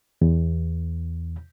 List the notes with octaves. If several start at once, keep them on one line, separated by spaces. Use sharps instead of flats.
E2